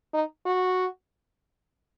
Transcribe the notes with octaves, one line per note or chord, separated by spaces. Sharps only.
D#4
F#4